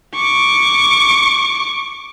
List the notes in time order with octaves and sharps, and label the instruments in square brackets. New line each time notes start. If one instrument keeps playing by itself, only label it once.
[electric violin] C#6 D6